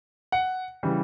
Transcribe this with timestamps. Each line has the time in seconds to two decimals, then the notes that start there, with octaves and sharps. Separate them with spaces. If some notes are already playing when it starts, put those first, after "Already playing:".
0.32 F#5
0.83 C#3 E3 G3